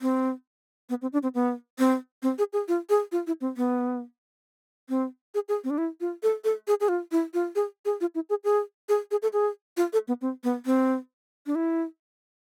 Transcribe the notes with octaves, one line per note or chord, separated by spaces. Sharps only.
C4
B3
C4
D4
C4
B3
C4
C4
G#4
G#4
F4
G#4
F4
E4
C4
B3
C4
G#4
G#4
C4
D4
E4
F4
A4
A4
G#4
G#4
F4
E4
F4
G#4
G#4
F4
E4
G#4
G#4
G#4
G#4
A4
G#4
F4
A4
B3
C4
B3
C4
D4
E4